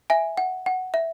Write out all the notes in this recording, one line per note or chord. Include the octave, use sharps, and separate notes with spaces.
E5 G#5
F#5
F#5
E5